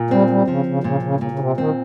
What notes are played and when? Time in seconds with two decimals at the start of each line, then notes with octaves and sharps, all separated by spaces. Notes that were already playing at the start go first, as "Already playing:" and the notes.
Already playing: A#2
0.11 G3 C4
0.30 G3
0.48 C#3 F3
0.66 C#3
0.84 A#2 C#3
1.03 C#3
1.20 A#2 C#3
1.31 C#3
1.39 C3
1.57 D#3 C4